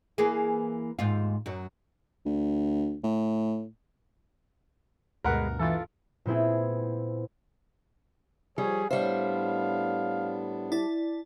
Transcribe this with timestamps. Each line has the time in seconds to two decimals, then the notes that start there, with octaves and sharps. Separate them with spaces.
0.18 E3 A#3 G#4
0.99 D#2 G#2 F4
1.46 F#2 F#3
2.25 D2
3.04 A2
5.24 D2 G2 B2 G#3 A#4 B4 F#5
5.59 E3 F4 A4
6.26 A#2 B3 C4 E4 G#4
8.58 F3 G3 G#4 C#5
8.91 A2 G3 B3 D4 C5 C#5 E5 F5
10.72 E4 D5 A5